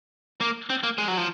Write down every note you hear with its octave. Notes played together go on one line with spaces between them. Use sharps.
A#3
C4
A#3
G#3
F#3
F3